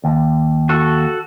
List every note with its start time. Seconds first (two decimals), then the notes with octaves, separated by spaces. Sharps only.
0.04 D#2
0.69 F#4 A4